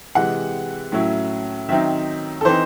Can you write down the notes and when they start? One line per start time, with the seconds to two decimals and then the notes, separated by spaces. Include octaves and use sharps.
0.15 C3 E3 G#3 F#5
0.92 A2 F#3 C#4 E4
1.69 D#3 F#3 C4 D#4 E5
2.41 A4
2.45 E3 C4 D#4 C5